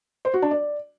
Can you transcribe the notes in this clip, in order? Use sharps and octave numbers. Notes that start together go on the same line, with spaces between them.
C5
F#4
D4
D5